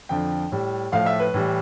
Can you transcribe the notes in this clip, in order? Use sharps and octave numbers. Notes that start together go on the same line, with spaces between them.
F2 D3 F3 G5
A2 G3
A2 F3 A3 F5
E5
B4
A2 E3 G3